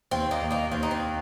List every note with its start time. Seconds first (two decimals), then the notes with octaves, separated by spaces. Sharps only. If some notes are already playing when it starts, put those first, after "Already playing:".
0.11 D#2 C4
0.31 A#3 D#4
0.41 D#2
0.51 A#3 D#4
0.71 D#2 C4
0.83 D#4
0.91 C4